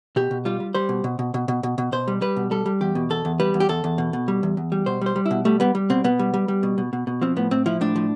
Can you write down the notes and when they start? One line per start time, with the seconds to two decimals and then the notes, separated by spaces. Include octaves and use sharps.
0.16 B2 G4
0.31 B2
0.45 G3 F4
0.60 G3
0.74 G3 C5
0.89 B2
1.04 B2
1.19 B2
1.34 B2
1.48 B2
1.63 B2
1.78 B2
1.92 B2 C5
2.08 G3
2.22 G3 B4
2.37 B2
2.51 G3 A4
2.66 G3
2.81 E2 G4
2.95 B2
3.10 E2 A4
3.25 E2
3.40 G3 B4
3.54 E2
3.60 G4
3.69 E2 A4
3.84 E2
3.98 B2
4.13 B2
4.28 G3
4.43 E2
4.57 E2
4.72 G3
4.86 B2 C5
5.01 G3 C5
5.16 G3
5.26 E4
5.31 B2
5.45 G3 A3
5.60 G3 B3
5.75 G3
5.90 B2 C4
6.04 B2 B3
6.19 G3
6.34 G3
6.48 G3
6.63 B2
6.78 B2
6.93 B2
7.07 B2
7.22 F3 C4
7.36 A2 B3
7.51 A2 C4
7.66 F3 E4
7.81 A2 D4
7.96 F3